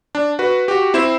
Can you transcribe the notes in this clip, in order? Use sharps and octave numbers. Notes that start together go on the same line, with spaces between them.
D4
F#4 B4
F#4 G4
C4 E4 C5 E7